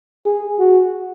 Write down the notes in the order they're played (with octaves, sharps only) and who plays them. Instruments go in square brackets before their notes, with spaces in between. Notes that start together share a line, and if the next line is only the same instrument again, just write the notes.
[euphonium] G#4
F#4